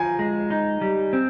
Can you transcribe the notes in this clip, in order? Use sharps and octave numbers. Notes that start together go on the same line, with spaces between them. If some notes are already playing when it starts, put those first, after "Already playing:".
Already playing: F3 G#5 A#5
G#3
D#4
G3
C4